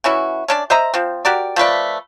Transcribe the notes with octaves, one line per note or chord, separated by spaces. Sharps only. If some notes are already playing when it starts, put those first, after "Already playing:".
E3 C#4 E4 F#4
C#4 D4 D5
C5 D#5 E5 A#5
F3 C4
F#4 G4 A#4 D5
F3 A3 B4 D5